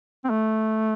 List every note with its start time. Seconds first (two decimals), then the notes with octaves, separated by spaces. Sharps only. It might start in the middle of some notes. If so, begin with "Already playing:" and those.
0.24 C4
0.30 A3